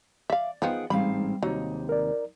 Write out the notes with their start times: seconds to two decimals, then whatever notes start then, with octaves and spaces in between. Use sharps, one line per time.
0.30 D5 E5 F5
0.62 D#3 F3 B3 G#4 F#5 G5
0.90 A1 G#2 G3 C4 F5 B5
1.43 D#2 C3 F#3 D#4
1.89 A#4 D5